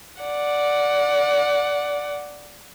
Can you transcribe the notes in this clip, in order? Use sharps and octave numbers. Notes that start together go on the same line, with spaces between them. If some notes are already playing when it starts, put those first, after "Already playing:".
D5 F#5